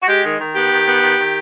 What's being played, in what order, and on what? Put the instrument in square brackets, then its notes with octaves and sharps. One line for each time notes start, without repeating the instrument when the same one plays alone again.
[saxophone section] F#4
G#3 G4
D#3
D#3
B3 G4
D#3
B3
D#3
D#3